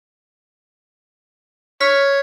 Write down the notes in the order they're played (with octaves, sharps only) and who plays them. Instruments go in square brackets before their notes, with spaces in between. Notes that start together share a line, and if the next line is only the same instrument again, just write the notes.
[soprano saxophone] C#5 [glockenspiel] F6 B6